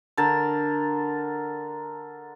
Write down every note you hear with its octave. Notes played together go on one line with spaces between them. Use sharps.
D3 A#4 A5